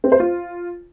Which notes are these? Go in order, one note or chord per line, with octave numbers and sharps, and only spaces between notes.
C4
C5
F4